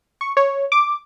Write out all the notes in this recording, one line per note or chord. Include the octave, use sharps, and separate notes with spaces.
C#6
C#5
D6